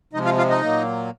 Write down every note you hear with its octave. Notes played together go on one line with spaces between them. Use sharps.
C3 F3 G#3 D#4 D#5
F4 F5
F4 F5
D#4 D#5
A#2 F#3 A#3